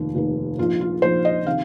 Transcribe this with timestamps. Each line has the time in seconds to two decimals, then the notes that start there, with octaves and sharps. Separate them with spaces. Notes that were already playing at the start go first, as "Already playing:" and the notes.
Already playing: F1 D#2 D#3
0.15 F1 D#2 D#3
0.58 A#1 G#2 F3 F4
0.81 F4
1.02 A#1 G#2 F3 C5
1.25 D#5
1.46 C3 D#3 F5